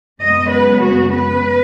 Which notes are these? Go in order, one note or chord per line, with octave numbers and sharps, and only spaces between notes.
F#2 C#3 G#3 B3 D#5
B4
F#4
B4